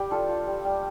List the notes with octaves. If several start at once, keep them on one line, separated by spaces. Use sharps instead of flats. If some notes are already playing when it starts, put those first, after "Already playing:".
Already playing: G3 G4
D4 F4 A4
F4
G3
G3